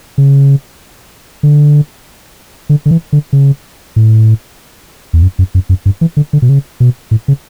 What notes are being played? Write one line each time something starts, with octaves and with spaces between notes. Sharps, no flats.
C#3
D3
D3
D3
E3
D3
C#3
A2
E2
F#2
F#2
F#2
F#2
G2
E3
D3
D3
B2
C#3
B2
A2
C#3